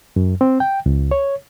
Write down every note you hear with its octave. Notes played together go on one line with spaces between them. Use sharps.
F#2
C4
G5
C#2
C#5